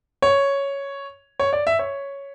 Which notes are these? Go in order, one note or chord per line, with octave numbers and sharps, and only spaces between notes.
C#5
C#5
D5
E5
C#5